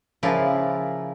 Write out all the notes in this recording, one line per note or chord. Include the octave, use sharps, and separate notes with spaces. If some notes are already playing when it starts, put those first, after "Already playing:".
C#3 F3 E4 F4 A#4 D5